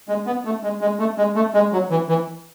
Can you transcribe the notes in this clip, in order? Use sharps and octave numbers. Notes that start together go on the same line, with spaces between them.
G#3
B3
A3
G#3
G#3
A3
G#3
A3
G#3
F#3
E3
E3